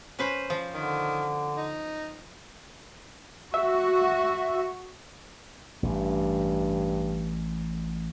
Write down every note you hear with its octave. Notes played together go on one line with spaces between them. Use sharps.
C#4 B4 C5
F3
D3 D#3
D#4
F#4 E5
A1 G2